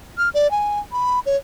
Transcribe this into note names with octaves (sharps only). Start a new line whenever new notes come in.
F6
D5
G#5
B5
C#5